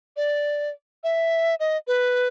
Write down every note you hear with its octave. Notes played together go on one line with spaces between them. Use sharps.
D5
E5
D#5
B4